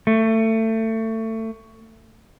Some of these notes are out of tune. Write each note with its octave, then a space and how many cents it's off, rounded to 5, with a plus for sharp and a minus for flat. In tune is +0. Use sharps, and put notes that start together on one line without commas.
A3 +25